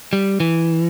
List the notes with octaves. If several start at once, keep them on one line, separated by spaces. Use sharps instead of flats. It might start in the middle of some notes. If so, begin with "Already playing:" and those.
G3
E3